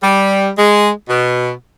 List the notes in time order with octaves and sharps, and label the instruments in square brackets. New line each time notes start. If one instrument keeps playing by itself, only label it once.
[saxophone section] G3
G#3
B2